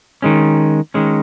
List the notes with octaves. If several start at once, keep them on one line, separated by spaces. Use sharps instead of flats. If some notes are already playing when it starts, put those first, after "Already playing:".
D#3 G#3 C#4
D#3 G#3 C#4